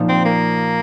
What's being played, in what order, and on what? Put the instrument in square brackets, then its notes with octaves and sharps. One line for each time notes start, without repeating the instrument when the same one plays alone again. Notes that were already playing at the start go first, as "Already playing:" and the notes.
Already playing: [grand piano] A#2 F3 D#4
[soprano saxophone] C4
A#3